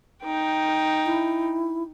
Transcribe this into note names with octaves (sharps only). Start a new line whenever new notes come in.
D#4 G5
E4